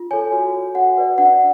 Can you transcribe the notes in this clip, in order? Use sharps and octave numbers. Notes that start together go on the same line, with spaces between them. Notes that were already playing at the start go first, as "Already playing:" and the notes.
Already playing: F4
A4 C#5 G#5
F#4
C#5
F#4 F#5
B4 D5
D4 F#5